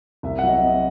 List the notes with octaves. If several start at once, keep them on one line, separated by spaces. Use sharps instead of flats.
C2 E5
F#5
F#3 D#5
E5
C3 D#5